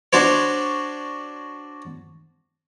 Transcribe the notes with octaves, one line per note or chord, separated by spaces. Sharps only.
D4 F#4 C5 C#5